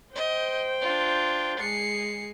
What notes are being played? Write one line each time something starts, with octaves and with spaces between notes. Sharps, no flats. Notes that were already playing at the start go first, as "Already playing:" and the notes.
C5 D#5 G5
D4 F4
G#3 G#4 C7 C#7